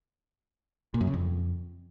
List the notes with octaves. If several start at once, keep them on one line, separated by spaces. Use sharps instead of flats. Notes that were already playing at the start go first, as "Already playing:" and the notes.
A#2
F#2
C#3
F2